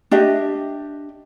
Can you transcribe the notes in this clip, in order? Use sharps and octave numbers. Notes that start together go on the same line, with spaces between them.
D4 G4 D#5 E5